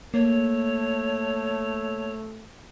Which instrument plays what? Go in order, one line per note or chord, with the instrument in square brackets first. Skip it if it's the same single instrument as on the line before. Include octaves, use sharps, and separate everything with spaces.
[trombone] A3 [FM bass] A#3 [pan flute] C#5